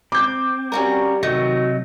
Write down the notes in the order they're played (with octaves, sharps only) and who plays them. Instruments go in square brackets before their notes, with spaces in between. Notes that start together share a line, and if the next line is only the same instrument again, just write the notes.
[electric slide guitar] C4 [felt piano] D6 G6
[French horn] G3 [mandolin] C#4 F#4 A#4
[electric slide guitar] C3 F#3 D#5 [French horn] D#3 [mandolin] A3 F#4